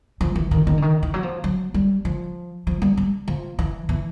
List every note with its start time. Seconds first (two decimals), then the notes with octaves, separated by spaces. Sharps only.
0.21 F3
0.36 E3
0.51 D#3
0.67 D#3
0.78 D3
0.82 D#3
1.03 E3
1.14 F#3
1.23 F3
1.44 F#3
1.74 G3
2.05 F3
2.67 F3
2.82 G3
2.97 G3
3.28 F3
3.59 E3
3.89 E3